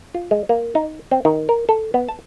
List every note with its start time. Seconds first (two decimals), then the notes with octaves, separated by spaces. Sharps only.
0.14 F4
0.31 G#3
0.49 A#3
0.75 D#4
1.11 C4
1.25 D#3
1.49 A#4
1.69 A4
1.94 B3
2.09 A5